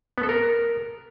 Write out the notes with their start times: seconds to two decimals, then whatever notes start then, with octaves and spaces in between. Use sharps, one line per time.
0.18 B3
0.23 A4
0.29 A#4